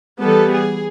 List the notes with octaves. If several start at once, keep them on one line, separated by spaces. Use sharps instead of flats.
E3 G3 B3 A4
G#4